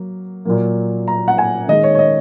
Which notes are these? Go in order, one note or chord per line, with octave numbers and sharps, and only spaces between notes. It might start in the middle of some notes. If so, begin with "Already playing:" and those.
Already playing: F#3 A#3
A#2 F#3 A#3
A#5
F#5
G#5
D#3 G#3 D#5
C#5
C#5
D#5